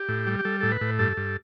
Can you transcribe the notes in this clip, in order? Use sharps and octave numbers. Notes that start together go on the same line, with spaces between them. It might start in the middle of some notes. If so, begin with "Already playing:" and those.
Already playing: G4
A2
G3
G4
G3 A4
A2 A4
B4
A2
G2 A4
G2